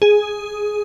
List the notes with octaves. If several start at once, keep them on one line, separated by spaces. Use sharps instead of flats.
G#4